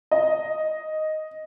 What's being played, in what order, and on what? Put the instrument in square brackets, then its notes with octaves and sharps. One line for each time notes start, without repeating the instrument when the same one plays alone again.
[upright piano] D#5